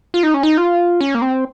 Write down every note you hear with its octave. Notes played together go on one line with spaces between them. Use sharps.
F4
D#4
C#4
D#4
F4
C#4
A#3
C4